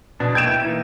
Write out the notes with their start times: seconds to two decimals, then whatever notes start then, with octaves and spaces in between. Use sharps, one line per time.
0.20 B2 D4
0.35 A#3 G5 G6 G#6 D7 E7
0.47 E4
0.62 E3 A#3 D#4 E4